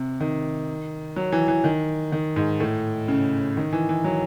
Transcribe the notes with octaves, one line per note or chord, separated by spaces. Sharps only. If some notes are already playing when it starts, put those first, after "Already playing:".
Already playing: C3
D#3
F#3
E3
E3
D#3
D#3
G#2
A2
C#3
D#3
E3
E3
F#3